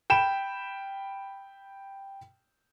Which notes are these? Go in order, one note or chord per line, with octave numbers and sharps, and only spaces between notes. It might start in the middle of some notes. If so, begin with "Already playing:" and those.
G5 B5 E7